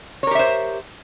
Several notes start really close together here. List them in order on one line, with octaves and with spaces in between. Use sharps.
C#5 A#4 G4 E5 C5